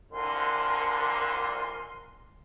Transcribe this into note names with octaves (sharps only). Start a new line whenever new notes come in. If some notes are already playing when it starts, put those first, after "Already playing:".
C2 F2 D3 A#4 G#5 C6